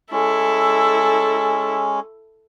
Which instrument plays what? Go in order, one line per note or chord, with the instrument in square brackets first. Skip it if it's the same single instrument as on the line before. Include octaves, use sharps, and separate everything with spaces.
[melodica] G#3 C#4 [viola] E4 A4